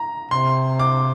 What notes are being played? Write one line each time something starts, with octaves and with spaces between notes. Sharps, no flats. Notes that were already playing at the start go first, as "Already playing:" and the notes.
Already playing: A#5
C3 C6
D6